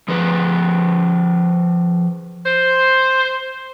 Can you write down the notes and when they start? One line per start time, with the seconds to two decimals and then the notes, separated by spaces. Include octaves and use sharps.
0.08 F3 G#4 B4
2.46 C5